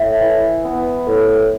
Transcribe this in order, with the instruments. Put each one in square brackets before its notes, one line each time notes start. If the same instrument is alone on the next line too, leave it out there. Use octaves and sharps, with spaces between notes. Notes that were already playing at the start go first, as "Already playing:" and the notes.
Already playing: [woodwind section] A2 [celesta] E5
[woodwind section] E3
B3
A2